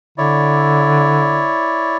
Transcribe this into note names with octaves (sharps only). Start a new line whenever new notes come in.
D3 E4 C#5 D5